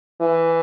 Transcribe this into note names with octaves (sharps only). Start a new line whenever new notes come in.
E3